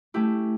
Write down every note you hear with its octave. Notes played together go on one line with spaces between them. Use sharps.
A3 C#4 E4 G4